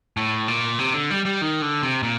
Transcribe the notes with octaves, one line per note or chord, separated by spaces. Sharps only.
A2
A#2
C3
D3
G3
G3
D#3
D3
C3
A#2